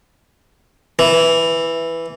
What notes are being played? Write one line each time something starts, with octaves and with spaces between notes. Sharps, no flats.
E3